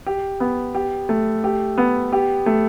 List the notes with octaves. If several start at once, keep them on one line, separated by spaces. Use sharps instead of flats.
G4
B3
G4
A3
G4
B3
G4
A3